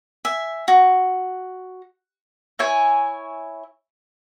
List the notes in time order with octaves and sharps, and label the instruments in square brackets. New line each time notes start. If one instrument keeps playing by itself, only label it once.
[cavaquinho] E5 G#5
F#4
[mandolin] E4 C#5 G#5